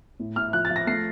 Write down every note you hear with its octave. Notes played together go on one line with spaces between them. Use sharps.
A2
A2 F6
F3 F#6
A6
F3
A#6
A3 C7